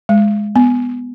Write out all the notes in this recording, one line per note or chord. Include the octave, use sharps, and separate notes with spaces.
G#3
B3